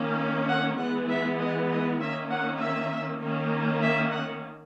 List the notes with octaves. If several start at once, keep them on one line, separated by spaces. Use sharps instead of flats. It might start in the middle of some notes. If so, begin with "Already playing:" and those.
Already playing: D#3 A#3 C#4
F#5
E3 G#3 B3 F#5
E5
D#5
D#5
D#3 A#3 C#4 E5
F#5
E5
D#3 A#3 C#4
E5
F#5